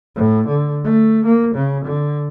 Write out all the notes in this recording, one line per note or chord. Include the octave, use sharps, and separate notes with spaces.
A2
D3
A3
A#3
C#3
D3